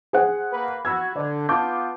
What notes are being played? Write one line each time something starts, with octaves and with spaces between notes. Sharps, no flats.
G#4 C5 F#5
A#3 B4
F#4 B5 E6 G#6
D3 D5
B3 F4 A5 D6 G6